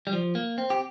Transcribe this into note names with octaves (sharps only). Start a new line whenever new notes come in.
G3
F3
A#3
C4
G4